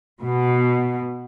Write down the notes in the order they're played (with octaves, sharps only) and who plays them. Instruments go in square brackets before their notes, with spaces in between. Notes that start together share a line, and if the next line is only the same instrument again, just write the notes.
[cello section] B2